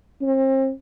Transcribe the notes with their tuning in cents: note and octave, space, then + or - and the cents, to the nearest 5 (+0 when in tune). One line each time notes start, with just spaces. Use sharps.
C4 +35